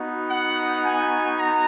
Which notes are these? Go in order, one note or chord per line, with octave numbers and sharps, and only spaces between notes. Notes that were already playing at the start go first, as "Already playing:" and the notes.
Already playing: B3 D#4 F#4
F#5
G#5
A#5